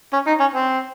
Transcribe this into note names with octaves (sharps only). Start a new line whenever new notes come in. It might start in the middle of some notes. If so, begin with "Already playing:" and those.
C#4
D#4
C#4
C4